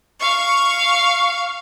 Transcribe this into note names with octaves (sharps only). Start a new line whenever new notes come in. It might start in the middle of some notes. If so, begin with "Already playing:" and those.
F5 C#6